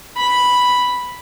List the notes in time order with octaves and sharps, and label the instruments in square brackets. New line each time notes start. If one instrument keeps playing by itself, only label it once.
[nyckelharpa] B5